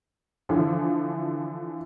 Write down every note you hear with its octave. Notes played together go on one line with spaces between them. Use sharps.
D3 E3 F3